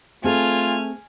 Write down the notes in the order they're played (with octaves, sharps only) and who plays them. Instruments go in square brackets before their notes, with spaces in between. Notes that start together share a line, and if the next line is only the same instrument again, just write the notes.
[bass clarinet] A3 [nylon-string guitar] C4 G#4 A4 [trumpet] F4 [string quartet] G#5 F6